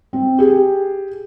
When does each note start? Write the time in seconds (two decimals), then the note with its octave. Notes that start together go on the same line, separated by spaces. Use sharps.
0.13 C4
0.39 G4 G#4